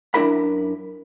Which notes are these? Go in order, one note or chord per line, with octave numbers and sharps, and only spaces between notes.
F#2 D4 E4 A#4 B5